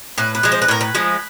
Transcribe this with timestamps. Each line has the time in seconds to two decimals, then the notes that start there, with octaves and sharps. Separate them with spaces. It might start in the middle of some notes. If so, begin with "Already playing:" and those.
0.18 A2 B4
0.35 B4
0.43 F3 G#3
0.52 C5
0.62 B4
0.68 A2 A#4
0.81 B4
0.95 F3 G#3